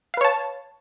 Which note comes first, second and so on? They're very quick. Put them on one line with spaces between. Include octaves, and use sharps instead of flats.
F5 B4 C#5 A5